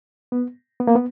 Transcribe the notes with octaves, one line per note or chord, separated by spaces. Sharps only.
B3
B3
A#3
B3